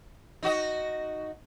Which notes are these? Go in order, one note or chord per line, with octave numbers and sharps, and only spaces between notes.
D#4 F#4 D#5